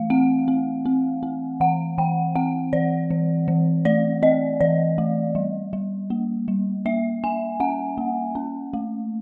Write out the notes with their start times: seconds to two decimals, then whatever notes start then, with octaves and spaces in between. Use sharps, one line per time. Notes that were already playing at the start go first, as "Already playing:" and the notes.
Already playing: E3 A3 F5
0.10 C4 F#5
0.48 C4
0.86 C4
1.23 C4
1.60 E3 F#5
1.98 E3 G5
2.36 C4 F#5
2.73 E3 D5
3.11 E3
3.48 E3
3.85 A3 D5
4.22 C4 D#5
4.61 E3 D5
4.98 A3
5.35 G3
5.73 G3
6.10 A#3
6.48 G3
6.86 A#3 E5
7.24 A#3 G#5
7.60 C#4 F#5
7.98 A#3
8.35 C#4
8.73 A3